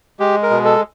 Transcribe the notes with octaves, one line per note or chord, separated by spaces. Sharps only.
G#3 G4
A#4
B2
A4